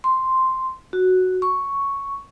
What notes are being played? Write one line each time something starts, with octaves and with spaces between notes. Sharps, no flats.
C6
F#4
C#6